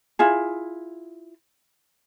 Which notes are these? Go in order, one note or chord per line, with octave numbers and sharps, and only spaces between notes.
E4 F4 G#4